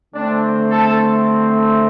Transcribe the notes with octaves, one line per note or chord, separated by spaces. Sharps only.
D3 A3 C4 D4
A4